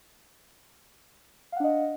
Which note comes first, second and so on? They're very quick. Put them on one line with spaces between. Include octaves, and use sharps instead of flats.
F5 F#5 D4 D#5